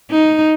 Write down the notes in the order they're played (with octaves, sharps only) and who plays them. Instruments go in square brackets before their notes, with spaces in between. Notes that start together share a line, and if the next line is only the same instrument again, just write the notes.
[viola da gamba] D#4